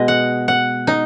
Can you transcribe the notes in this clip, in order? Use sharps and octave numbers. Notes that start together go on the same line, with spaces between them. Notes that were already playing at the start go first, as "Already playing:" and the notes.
Already playing: B2 G#3 D#5
F#5
F#5
D#4